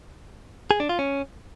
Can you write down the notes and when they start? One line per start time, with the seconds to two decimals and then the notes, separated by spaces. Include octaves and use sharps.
0.71 G#4
0.80 D4
0.89 F4
0.99 C#4